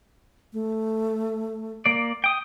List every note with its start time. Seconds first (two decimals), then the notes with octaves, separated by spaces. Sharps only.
0.53 A3
1.86 A#3 D5
2.24 G5 D#6